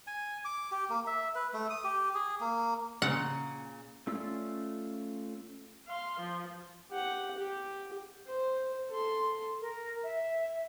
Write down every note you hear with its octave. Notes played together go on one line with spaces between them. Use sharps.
G#5
D6
G4
A#3
E5
B4
A3
D#6
G4
G#4
A#3
A#2 C#3 F#5 A#5
A3 C#4 F4 D5 E6
F5 C6
F3
G4 F#5
G4
C5
A4 C6
A#4
E5